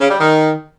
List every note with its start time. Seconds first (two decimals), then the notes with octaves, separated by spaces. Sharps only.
0.01 C#3
0.10 G3
0.19 D#3